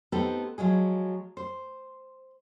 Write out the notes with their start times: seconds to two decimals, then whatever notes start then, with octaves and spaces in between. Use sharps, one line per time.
0.12 B3 C4 D#4 G4 A4
0.58 F3 F#3 G#3 G#4
1.37 C5